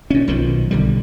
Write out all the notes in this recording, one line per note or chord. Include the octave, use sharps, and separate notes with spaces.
A#2 C#4
B1 B2 D#3 F3
B1 D3 G3